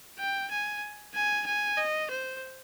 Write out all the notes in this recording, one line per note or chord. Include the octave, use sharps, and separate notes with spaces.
G5
G#5
G#5
G#5
D#5
C5